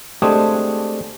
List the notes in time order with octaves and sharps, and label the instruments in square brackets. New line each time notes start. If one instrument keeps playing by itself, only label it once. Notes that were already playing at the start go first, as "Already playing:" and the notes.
[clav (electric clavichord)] G#3 A3 C4 D4 G4 G#4